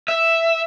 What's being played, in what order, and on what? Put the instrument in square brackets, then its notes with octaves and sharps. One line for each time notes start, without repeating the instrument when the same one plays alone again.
[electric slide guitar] E5